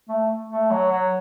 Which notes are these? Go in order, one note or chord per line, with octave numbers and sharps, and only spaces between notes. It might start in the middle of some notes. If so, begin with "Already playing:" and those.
A3
A3
F#3
F#3